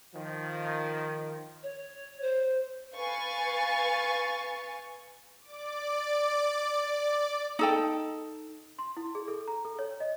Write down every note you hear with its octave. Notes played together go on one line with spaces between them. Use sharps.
D#3 F3
C#5
C5
B4 F5 G#5 C#6 A6
D5 D6
D#4 A4 G5
C6
E4
G#4
A4
A#5
A4
C#5
D#5